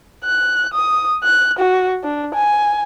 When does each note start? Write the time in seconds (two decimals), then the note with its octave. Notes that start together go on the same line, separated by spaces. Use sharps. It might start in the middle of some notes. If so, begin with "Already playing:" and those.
0.24 F#6
0.74 D#6
1.24 F#6
1.59 F#4
2.04 D4
2.34 G#5